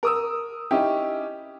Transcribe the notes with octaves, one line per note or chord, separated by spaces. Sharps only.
A#4 D#6 E6
C#4 D#4 E4 G4